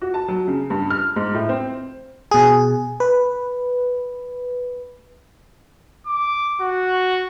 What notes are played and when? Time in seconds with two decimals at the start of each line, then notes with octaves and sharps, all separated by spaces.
0.01 F#4
0.14 A5
0.28 F#3
0.48 C#3
0.70 G2
0.90 F6
1.16 G#2
1.34 A2
1.49 C4
2.31 B2 G#4
3.00 B4
6.07 D6
6.62 F#4